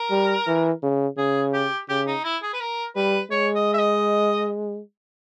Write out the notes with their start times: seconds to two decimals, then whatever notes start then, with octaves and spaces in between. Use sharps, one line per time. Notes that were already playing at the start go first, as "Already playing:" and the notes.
Already playing: A#4
0.11 G3
0.47 E3
0.83 C#3
1.17 C#3 G#4
1.53 G4
1.89 C#3 G4
2.07 D#4
2.24 E4
2.43 G#4
2.54 B4
2.60 A#4
2.96 G3 B4
3.31 G#3 C#5
3.55 D#5
3.74 E5
3.79 D#5